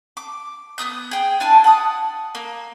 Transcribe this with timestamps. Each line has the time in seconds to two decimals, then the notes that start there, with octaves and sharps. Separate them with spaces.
0.17 D6
0.78 B3 A#4 D#6 G6
1.11 G#4 G5
1.40 D4 E4 G#5 A5
1.64 F#5 D#6
2.35 A#3